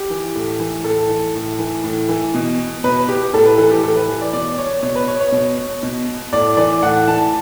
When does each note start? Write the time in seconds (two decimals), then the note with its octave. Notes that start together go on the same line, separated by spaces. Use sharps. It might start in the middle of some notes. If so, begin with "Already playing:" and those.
Already playing: G4
0.10 E3
0.35 A2
0.60 E3
0.84 A2 A4
1.09 E3
1.35 A2
1.59 E3
1.84 A2
2.09 E3
2.34 B2
2.84 B2 B4
3.08 G4
3.33 A2 A4
3.45 B4
3.58 E3 A4
3.71 G4
3.83 A2 A4
3.96 B4
4.08 E3
4.21 D5
4.33 B2 D5
4.58 C#5
4.83 B2 C#5
4.95 B4
5.08 C#5
5.20 C#5
5.32 B2
5.83 B2
6.33 A2 D5
6.57 E3 D5
6.83 A2 F#5
7.07 E3 A5